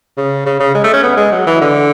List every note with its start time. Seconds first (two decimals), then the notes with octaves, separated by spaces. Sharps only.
0.17 C#3
0.46 C#3
0.60 C#3
0.75 G#3
0.84 A3
0.93 C#4
1.03 B3
1.17 G#3
1.32 F#3
1.47 E3
1.61 D3